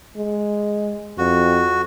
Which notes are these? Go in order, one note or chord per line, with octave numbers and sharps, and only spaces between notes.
G#3
F2 F#4